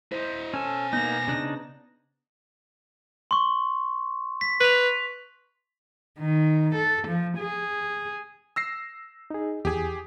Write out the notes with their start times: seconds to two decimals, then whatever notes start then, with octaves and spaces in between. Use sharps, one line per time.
0.12 E4 C5 D#5
0.54 B2 C#4 A4 G#5
0.93 A#3 B3 D#4 A#6
1.28 C#3 D4 D#4
3.31 C6 C#6
4.41 B6
4.60 B4 B6 F7
6.19 D#3
6.75 A4
7.08 F3
7.38 G#4
8.56 E6 A#6 C7
9.30 D#4 G#4
9.65 E2 G4 G#4 G#5